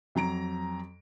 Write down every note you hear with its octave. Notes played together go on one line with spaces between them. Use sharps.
F2 F#3 A#5 D7